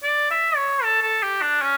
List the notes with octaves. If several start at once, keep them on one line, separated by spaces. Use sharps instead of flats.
D5
E5
C#5
A4
A4
G4
D4
C#4